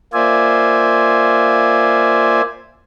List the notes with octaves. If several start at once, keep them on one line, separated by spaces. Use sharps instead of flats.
A#3 F4 C5 D5 E5 G#5